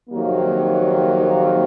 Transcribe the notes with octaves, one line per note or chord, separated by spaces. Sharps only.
F2 C3 D#3 F#3 A#3